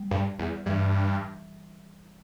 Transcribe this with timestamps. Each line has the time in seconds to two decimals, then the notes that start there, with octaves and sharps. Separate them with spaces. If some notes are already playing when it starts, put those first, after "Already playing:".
Already playing: G3
0.11 G2
0.39 E2
0.66 G2 E3